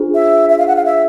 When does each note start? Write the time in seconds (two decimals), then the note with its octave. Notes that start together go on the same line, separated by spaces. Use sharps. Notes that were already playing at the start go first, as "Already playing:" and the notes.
Already playing: D4 F4 G#4 C5
0.15 E5
0.50 E5
0.59 F5
0.68 F#5
0.76 F5
0.85 E5